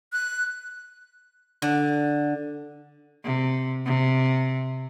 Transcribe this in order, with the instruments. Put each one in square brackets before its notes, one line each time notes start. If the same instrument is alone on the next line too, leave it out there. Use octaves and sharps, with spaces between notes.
[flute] F#6
[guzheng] D3
[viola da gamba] C3
C3